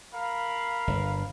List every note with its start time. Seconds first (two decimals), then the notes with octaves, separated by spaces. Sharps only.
0.14 A#4 F5 B5
0.87 G1